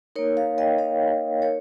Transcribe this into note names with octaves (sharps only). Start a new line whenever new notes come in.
A#3 D#4 A#4 C#5
C#5 F5
D#5 G5
C#5 F5
A#3 D#4 A#4 C#5